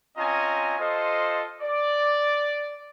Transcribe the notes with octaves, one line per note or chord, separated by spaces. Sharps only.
C4 C#4 F4 D#5 G#5 A#5
F4 A4 C5 D#5
D5